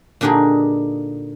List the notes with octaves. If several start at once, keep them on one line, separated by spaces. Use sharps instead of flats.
A#2 D3 D4 D#4 G4 G#4